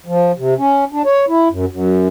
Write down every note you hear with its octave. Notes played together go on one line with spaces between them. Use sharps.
F3
C3
C#4
D4
C#5
E4
F#2
F#2